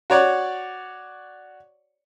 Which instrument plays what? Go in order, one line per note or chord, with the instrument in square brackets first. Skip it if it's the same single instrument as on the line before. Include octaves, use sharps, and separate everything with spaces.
[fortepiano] F#4 C#5 D5 F#5